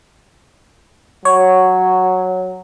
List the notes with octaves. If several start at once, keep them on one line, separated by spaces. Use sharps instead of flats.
F#3 C#5